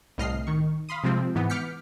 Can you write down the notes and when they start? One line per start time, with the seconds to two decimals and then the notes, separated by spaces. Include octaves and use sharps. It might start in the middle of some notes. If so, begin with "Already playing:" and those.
0.18 C2 A2 D#5 F6 C7
0.47 D#3 C#6
0.89 F5 B5 C6 D#6
1.03 C3 F3 G#3 C4
1.35 G#2 E3 B3
1.50 D6 F6 G6 B6 C#7